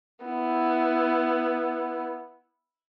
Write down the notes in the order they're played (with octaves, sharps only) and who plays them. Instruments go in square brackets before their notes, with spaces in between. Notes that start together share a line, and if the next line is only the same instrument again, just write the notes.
[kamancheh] B3 E4